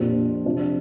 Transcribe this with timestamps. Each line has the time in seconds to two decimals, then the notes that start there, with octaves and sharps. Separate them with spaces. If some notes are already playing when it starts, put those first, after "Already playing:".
Already playing: F2 A#2 F3 D4 G4 C5
0.46 C3 F3 D4